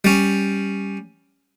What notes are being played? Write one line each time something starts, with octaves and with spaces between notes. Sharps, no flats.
G3 C#4